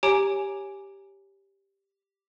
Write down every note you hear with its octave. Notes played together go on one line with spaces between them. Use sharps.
G4 C#5 G#5 A#5 D6 D7